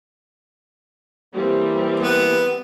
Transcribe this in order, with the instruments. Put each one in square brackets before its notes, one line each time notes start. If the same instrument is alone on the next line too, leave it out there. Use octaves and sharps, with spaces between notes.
[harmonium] E3 A#3 [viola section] G3 C4 G4
[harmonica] B3